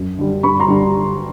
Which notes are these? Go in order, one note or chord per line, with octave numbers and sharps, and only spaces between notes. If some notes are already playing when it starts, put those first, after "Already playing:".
Already playing: F#2
D3 G3
G2 B5 C#6
A#5 C6
D3 G3